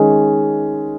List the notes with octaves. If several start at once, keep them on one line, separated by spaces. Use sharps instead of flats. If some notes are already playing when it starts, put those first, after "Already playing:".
Already playing: D#3 G#3 C#4 G#4